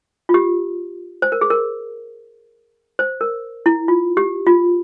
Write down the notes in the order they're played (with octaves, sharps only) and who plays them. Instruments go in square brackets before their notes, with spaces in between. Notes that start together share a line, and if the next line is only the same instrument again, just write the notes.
[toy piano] F4
G4
C5
A#4
G#4
A#4
C5
A#4
E4
F4
G4
F4